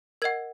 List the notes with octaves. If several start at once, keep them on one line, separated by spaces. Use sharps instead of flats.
A#4 D#5 F#5 G#6